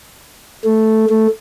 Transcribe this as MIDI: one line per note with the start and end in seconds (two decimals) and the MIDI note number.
0.64 1.05 57
1.09 1.27 57